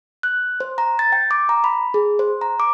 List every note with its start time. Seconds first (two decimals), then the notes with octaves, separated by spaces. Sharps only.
0.23 F#6
0.60 C5
0.78 A#5
0.99 A6
1.12 G5
1.31 D6
1.49 A#5
1.64 B5
1.94 G#4
2.19 C5
2.41 A#5
2.60 D6